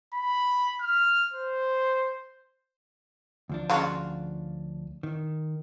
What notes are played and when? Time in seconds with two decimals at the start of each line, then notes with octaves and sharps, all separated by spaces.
0.14 B5
0.81 F6
1.33 C5
3.49 D2 F3 D4
3.70 C#3 F4 F#4
5.03 D#3